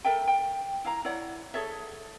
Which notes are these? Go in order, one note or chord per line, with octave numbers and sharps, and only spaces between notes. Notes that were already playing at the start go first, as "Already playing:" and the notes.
A4 A#4 E5 G5
G5
E4 F5 A#5
E4 C#5 D5 F#5
G#4 A4 C#5 E5